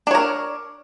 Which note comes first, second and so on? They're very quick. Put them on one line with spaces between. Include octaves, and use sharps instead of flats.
D4 C#5 A#4